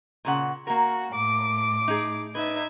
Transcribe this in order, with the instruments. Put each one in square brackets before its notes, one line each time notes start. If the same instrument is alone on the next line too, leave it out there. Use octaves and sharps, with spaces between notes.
[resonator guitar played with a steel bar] A#2 C#3 F#5
[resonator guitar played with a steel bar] A#3 A#4 [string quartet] F#4
[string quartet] A2 D6
[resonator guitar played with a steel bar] D#4 G#4
[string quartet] D#4 E5 G#6 [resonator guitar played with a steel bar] B4